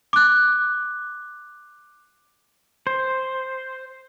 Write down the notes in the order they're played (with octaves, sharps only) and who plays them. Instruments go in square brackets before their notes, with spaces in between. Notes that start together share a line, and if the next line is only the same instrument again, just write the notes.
[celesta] D6 F#6
[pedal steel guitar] C5